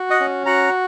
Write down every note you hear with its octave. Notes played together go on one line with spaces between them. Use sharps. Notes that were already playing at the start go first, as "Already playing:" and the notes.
Already playing: F#4
D#5 F#5
C#4
F#4 F#5 A#5